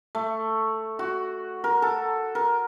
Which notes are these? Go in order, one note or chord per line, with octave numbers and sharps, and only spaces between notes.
A3
F#4
A#4
A4
A#4